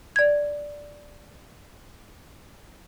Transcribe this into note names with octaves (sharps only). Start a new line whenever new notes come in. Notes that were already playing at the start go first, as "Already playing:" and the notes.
D5 G#6